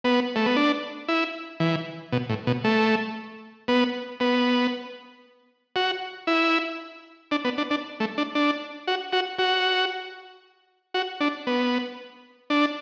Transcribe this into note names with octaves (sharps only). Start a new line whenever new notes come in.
B3
A3
B3
D4
E4
E3
B2
A2
B2
A3
B3
B3
F#4
E4
D4
B3
D4
D4
A3
D4
D4
F#4
F#4
F#4
F#4
D4
B3
D4